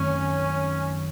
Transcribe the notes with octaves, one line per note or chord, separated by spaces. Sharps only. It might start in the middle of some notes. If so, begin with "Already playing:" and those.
Already playing: F#2 D#3 A3 C4 C#4